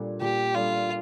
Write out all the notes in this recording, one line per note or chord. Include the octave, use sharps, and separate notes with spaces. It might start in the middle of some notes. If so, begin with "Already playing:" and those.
Already playing: A#2 G3 D4 A4
A#2 G4
G3 D4 F4 A4